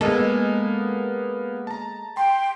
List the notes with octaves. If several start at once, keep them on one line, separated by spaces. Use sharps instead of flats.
G#3 A#3 B3 A4
A5 A#5
G5 C6